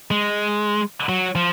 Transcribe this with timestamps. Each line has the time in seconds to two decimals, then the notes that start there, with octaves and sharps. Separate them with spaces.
0.11 G#3
1.09 F#3
1.35 F3